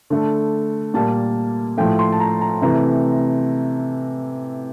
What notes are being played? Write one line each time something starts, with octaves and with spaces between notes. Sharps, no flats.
D3 A3
A#2 G3 A#3 A5
A2 F3 A3 G5
C6
A5
A#5
A#5
C3 E3 A3 A#5